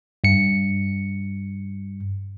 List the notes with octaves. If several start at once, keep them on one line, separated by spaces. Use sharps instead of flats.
G2 C#7